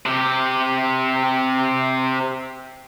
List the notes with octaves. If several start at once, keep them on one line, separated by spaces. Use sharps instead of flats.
C3 G4